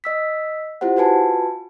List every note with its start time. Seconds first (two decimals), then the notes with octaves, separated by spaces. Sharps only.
0.04 D#5 E6 B6
0.81 E4 F4 G4 C5 F#5
0.96 F4 F#4 B4 G#5 A5